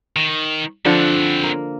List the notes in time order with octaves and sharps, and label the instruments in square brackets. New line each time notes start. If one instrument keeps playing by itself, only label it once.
[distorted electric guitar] D#3
[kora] D3 F3 D4 [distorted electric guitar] C4 F#5
[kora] A#3